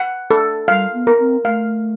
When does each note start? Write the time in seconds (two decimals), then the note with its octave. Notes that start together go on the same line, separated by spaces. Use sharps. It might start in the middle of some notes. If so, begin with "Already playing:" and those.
Already playing: F#5
0.31 A4
0.68 G3 F5
0.93 B3
1.07 A#4
1.19 C4
1.45 A3 F5